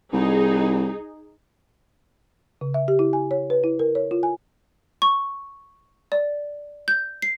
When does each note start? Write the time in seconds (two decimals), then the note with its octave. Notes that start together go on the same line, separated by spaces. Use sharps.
0.13 C2 D#4 G#4
2.61 C#3
2.74 E5
2.88 G4
2.99 E4
3.13 G#5
3.31 C#5
3.50 B4
3.64 E4
3.79 A#4
3.95 C#5
4.11 F4
4.23 G#5
5.02 C#6
6.12 D5
6.88 G6
7.22 C7